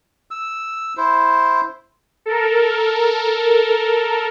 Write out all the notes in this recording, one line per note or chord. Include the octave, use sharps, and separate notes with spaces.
E6
E4 C5
A4 A#4